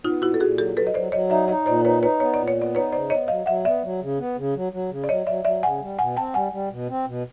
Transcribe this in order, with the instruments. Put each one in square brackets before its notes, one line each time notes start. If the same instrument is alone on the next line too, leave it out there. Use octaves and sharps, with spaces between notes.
[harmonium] B3 [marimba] D#4 F4
[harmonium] A#2 [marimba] E4 F#4
[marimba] A4
[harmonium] A#2 [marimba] F#4 G#4
[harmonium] F#3 [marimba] G4 A4
[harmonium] F#3 [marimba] A4 B4
[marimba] D#5
[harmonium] F#3 [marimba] C5 D5
[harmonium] F#3 [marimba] C#5 D#5
[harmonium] D#4 [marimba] D5 E5
[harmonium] D#4 [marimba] C#5 D#5
[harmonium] A#2 [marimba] C5 D5
[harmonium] D#4 [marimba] B4 C#5
[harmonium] D#4 [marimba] B4 C#5
[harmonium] B3 [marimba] C#5
[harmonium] A#2 [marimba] D5
[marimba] C#5
[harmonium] B3
[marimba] D5
[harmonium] D#4 [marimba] B4 C#5
[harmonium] C#3 [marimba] C5 D5
[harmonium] B3 [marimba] C#5 D#5
[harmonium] F#3 [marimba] D#5 F5
[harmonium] F#3 [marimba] E5 F#5
[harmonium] B3 [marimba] D5 E5
[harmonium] F#3
C#3
B3
C#3
F#3
F#3
C#3
[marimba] D5
[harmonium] F#3 [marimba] C#5 D#5
[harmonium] F#3 [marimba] D5 E5
[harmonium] F#3 [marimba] D5 E5
[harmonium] C#3 [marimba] F#5 G#5
[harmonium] G3
[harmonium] B2 [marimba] F#5 G#5
[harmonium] C4 [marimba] G5 A5
[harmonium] G3 [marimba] F#5 G#5
[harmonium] G3
B2
C4
B2